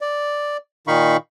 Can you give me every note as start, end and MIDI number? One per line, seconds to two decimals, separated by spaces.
0.01 0.57 74
0.87 1.17 46
0.87 1.17 51
0.87 1.17 63
0.87 1.17 77
0.87 1.17 83
0.87 1.17 85